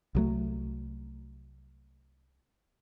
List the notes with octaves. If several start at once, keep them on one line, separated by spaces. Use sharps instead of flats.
C2 F#3 A3